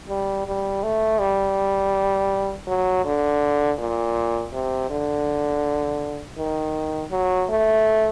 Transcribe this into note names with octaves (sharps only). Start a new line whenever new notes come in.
G3
G3
A3
G3
F#3
D3
A#2
C3
D3
D#3
F#3
A3